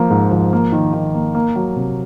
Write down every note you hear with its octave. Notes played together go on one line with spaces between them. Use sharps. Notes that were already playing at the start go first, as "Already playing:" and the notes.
Already playing: F3 A#3
G#2
F3
A#3
D#3
D#3
A#3
A#3
F#3
C3